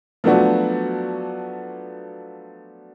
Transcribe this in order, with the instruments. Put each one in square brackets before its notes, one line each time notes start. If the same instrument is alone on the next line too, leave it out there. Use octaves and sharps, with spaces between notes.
[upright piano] F3 F#3 A3 B3 D4 F#4